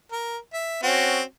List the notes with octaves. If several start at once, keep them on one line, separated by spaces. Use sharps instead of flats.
A#4
E5
C4 C#4 F#4